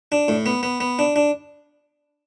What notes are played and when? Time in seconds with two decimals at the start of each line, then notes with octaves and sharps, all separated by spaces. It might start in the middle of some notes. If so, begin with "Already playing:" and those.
0.12 D4
0.28 A2
0.46 B3
0.63 B3
0.80 B3
0.99 D4
1.16 D4